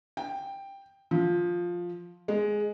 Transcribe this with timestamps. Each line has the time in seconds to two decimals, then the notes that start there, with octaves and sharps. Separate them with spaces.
0.17 G5
1.11 F3
2.28 G#3